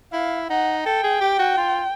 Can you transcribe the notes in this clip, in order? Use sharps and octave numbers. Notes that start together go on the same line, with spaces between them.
E4 F5
D#4 F#5
A4 G5
G#4
G4
F#4
F4